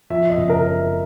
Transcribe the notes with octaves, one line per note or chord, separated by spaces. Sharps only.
F3 E5
D#5
F#1
A#4